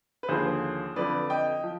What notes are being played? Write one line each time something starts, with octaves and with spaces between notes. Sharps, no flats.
B4
D#2 D3 F3 G#4 C5
F2 D3 F3 B4 D5
D#5 G5
F3